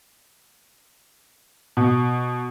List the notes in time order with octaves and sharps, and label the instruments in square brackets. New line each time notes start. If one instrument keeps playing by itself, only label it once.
[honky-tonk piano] B2